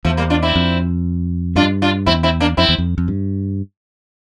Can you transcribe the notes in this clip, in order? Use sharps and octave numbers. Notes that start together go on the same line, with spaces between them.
E2 F3 A3
G3 A#3
D4 F4
C4 E4
F2
G2 D4 F4
D4 F4
E2 C4 E4
C4 E4
A#3 D4
F2 C4 E4
E2
F2
F2
G2